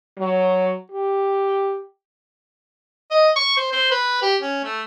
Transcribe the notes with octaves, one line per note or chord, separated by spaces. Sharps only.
F#3
G4
D#5
C#6
C5
C5
B4
G4
C#4
A3